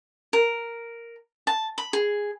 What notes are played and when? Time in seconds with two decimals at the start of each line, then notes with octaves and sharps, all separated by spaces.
0.33 A#4
1.47 A5
1.78 B5
1.93 G#4